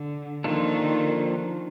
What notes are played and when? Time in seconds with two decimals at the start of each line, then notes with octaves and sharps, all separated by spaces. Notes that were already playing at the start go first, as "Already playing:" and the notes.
Already playing: D3
0.44 D#3 F3 A#3 D4 F4 A4